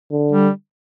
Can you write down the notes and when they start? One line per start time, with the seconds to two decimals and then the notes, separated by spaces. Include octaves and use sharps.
0.12 D3
0.32 G3